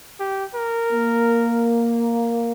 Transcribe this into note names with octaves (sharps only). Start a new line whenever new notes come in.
G4
A#4
A#3